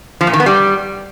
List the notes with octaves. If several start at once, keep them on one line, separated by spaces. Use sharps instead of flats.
F3
A#2
D#3
B3
G3